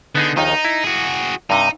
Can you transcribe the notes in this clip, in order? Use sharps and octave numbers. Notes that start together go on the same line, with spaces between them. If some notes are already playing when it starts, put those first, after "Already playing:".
D3 B3 D#4 G#4
A#1 D#2 D#3 D#4
E4
F#4 G#4
G2 C3 D#4